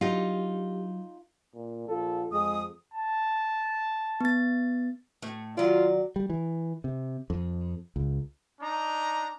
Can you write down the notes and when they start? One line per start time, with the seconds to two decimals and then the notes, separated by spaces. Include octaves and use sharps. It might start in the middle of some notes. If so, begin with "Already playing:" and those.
0.01 F#3 D4 D#4 F4 G4
1.55 A#2
1.89 A#1 F4 A4
2.33 F2 G#3 D#6
2.94 A5
4.21 B3 A6
5.22 A2 A3
5.57 D#3 F#3 F4 D5
6.16 G3
6.30 E3
6.84 C3
7.30 F2
7.96 C#2
8.61 D4 D#4 A#5